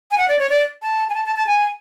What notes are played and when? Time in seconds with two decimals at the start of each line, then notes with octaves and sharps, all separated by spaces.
0.11 G#5
0.18 F#5
0.28 D5
0.39 C#5
0.50 D5
0.82 A5
1.09 G#5
1.14 A5
1.25 A5
1.36 A5
1.47 G#5